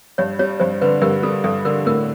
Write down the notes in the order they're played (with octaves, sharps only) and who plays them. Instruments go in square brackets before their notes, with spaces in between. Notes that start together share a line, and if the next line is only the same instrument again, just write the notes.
[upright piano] G2 [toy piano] C#5
[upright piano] G3 [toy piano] C#5
[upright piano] G2 [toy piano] C5
[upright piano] D3 [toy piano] B4
[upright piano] G2 [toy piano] A#4
[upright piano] G3 [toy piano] A4
[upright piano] G2 [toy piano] A4
[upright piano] D3 [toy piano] A#4
[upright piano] A2 [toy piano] A#4